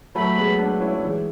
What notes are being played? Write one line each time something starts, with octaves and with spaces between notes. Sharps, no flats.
F#3 A3 B5
G#3 B3
B3 D4
C#4 E4
F#3
E3 G#3